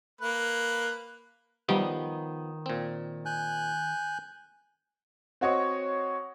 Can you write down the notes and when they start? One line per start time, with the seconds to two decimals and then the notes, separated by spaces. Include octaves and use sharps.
0.21 A#3 B4
1.69 D#3 F3 G3 B3 D#4 G4
2.66 A#2 C4
3.25 G#5 F#6 G6
5.41 C4 F#4 C#5 D#5 C#6